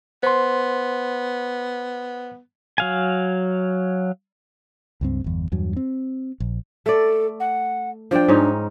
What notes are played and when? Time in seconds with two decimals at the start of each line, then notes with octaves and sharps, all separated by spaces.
0.23 B3 C5 C6
2.78 F#3 F5 G#5
5.01 C#2 G2 C4
5.24 G1 E2
5.52 E2 G2 F#3
5.77 C4
6.40 A#1
6.86 A3 A4 D5
7.40 F#5
8.11 F3 D4 D5 G5
8.28 G#2 C#4 D#4